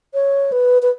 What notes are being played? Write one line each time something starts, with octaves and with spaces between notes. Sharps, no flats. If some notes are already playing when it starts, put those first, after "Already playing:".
C#5
B4
B4